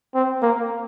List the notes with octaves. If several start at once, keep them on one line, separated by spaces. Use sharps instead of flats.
C4
A#3